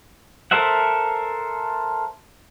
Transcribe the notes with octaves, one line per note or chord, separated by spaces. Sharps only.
A4 A#4 C5 E5 F#5